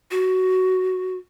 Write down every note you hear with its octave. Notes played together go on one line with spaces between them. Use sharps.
F#4